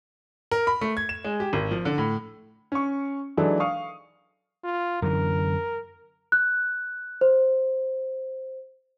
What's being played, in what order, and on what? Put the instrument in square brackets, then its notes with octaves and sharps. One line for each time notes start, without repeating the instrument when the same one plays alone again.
[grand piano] A#4
B5
A3
G#6
E7
G#3
G4
G#1
F3
D3
A2
C#4 C#6
E3 F#3 G#3 D4 D#4 A4
F5 C#6 D#6
[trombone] F4
[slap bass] F#2 D3 E3 [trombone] A#4
[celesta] F#6
C5